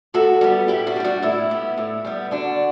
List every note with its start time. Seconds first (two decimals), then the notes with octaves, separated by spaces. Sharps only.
0.14 A2 F#4 A4
0.41 G3 B3
0.68 A2 E4 G4
0.87 D4 F#4
0.96 G3 B3
1.04 D4 F#4
1.22 A2 E4
1.50 G3 B3
1.77 A2
2.05 G3 B3
2.31 D3 D4 F#4